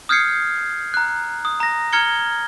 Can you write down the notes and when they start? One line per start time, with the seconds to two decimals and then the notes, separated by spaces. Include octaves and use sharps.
0.09 D#6 F6 G6 G#6 C7 C#7
0.94 A#5 F#6
1.45 D#6
1.60 A#5 A#6
1.93 A#5 F6 G#6 C#7 G7